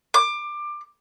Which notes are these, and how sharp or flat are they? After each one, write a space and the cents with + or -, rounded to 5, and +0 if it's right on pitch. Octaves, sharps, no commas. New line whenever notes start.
D6 +20